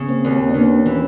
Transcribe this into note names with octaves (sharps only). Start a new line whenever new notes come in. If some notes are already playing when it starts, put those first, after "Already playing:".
Already playing: C#3 B3 C#4
A#3 C4
D#2
D4
D#2 B3 C#4
E3
C#4